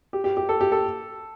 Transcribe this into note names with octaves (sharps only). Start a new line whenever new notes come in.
G4
G4
G4
A4
G4
A4